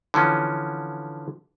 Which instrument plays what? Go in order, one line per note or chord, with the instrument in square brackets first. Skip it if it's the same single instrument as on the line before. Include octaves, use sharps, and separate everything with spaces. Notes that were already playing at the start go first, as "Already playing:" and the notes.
[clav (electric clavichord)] D3 E3 F3 C#4